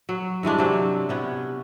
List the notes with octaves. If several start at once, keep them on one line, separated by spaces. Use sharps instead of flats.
F#3
G2 E3 G#3 D4
C3 F#3 C4
C3 B3 C#4